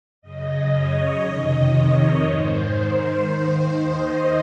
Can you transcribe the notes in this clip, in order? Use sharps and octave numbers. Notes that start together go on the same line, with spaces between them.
F#2 C#3 D#5
C#5
F2 C3 D#3 D#5
C#5
G#2 D#3 C5
C5
D#2 D#3
D#5